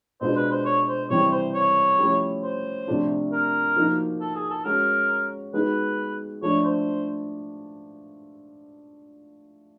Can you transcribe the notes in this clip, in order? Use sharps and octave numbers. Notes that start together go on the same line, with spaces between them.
B2 G#3 B3 D4 F4 C5
B4
C5
C#5
C5
C3 E3 G3 C4 C#5
C5
C#5
F3 A3 C#4 E4 G4
C5
C3 F3 A3 D4 F4
A#4
F3 A#3 D#4 F#4
A4
G#4
A4
G#3 C#4 F#4 A#4
G#3 B3 D#4 F#4 B4
F3 A3 D4 C#5
C5